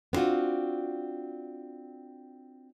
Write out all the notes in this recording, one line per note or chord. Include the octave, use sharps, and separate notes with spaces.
B3 C4 D4 F4 F#4